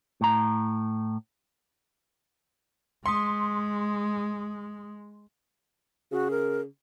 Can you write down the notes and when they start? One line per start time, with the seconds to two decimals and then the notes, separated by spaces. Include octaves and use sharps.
0.21 A2 A#5
3.06 G#3 C6 D#6 B6 C#7
6.12 C#3 F#4
6.31 A#4